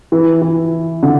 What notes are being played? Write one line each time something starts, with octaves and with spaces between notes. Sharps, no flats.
E3
E3
D3